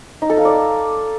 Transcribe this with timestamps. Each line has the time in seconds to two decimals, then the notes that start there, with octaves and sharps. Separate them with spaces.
0.22 D#4
0.30 A4
0.37 F5
0.45 D5